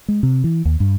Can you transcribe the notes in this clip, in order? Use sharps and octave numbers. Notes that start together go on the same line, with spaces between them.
G#3
C3
E3
D#2
G2